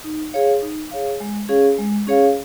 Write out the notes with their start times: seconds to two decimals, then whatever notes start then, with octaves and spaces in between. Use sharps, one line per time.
0.04 D#4
0.33 G#4 C#5 F5
0.62 D#4
0.91 G#4 C#5 F5
1.20 G#3
1.49 C#4 G#4 C#5 F5
1.78 G#3
2.07 C#4 G#4 C#5 F5